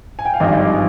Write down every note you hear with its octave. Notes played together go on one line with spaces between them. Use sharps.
G#5
G5
F5
G#1 G2 F3 D#4 D#5